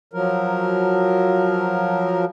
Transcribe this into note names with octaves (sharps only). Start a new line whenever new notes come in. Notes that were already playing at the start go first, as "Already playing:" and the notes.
F3 F#3 A#4